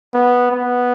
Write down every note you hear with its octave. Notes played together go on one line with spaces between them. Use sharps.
B3
B3